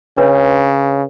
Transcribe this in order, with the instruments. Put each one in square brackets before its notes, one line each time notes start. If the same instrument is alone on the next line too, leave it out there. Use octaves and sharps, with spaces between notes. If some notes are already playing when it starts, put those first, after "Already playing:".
[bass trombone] C#3 [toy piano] D4 B4 C#5